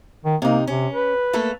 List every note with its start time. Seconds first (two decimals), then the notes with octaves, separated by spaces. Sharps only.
0.25 D#3
0.42 C3 A#3 D#4
0.67 C3 C#4
0.93 B4
1.33 A3 A#3 A4